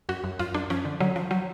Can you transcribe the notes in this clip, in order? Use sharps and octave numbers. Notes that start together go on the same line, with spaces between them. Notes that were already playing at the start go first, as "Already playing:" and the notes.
F#2 F#4
F#2
F#2 F4
F#2 D4
F3 C#4
D3
D3 F#3
F3
F#3